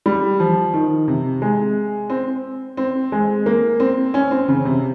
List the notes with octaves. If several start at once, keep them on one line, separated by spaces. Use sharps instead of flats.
G3
F3
D#3
C3
G#3
C4
C4
G#3
A#3
C4
C#4
C4
C#3
C3